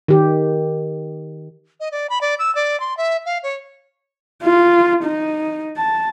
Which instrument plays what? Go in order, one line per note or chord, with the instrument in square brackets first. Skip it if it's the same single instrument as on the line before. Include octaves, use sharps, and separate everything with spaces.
[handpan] D#3 G4
[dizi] D#5
D5
B5
D5
E6
D5
C6
E5
F5
C#5
[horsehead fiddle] F4
D#4
A5